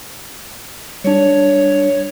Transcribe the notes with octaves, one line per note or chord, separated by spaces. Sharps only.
G3 D4 C#5